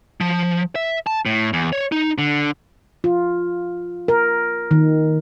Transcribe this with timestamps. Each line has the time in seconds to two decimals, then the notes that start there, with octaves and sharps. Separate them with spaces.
0.21 F3
0.75 E5
1.07 A5
1.26 A2
1.53 E2
1.73 C#5
1.92 D#4
2.18 D3
3.04 F4
4.08 A#4
4.71 D#3